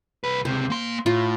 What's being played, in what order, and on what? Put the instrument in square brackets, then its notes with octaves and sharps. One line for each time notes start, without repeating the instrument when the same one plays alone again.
[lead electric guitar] C2 B4
[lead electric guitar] C#2 C3 [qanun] C5
[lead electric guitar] A#3 C6
[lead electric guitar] A2 [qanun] F4